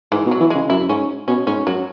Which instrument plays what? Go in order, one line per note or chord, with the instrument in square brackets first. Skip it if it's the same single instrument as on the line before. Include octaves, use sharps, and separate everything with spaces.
[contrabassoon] G#2 [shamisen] E3
[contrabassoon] B2
[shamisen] F#3
[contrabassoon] E3
[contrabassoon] C#3 [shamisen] G#3
[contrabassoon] F#2 [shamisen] E4
[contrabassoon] G#2 [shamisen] C#4
[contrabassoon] B2 [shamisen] C#4
[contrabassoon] G#2 [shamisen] C#4
[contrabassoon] F#2 [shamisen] F#3